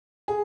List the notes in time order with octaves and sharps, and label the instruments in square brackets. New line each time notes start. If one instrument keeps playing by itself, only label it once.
[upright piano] G#4